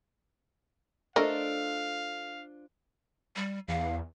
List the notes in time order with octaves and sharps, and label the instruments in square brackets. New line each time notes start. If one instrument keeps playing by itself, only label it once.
[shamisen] A3 A#4 [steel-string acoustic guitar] D4 F4 C5 [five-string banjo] A4 D#5 [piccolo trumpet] F5
[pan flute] G3
[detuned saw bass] E2 [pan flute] F5